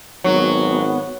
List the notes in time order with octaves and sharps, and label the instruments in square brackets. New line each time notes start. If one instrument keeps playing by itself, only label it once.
[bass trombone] G#1 [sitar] F#3 [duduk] B3